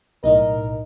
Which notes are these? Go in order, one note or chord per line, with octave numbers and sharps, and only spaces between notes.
B1 A2 D#4 A#4 D#5